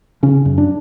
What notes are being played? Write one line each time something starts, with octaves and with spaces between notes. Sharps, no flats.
C#3 C#4
F#2
D4